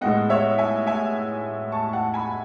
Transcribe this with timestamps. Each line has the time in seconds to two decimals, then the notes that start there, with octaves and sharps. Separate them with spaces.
0.01 A2 G#3 B3 D#5 F#5
0.30 C#5 E5
0.58 E5 G#5
0.87 E5 G#5
1.72 A5 C#6
1.93 F#5 A5
2.14 G#5 B5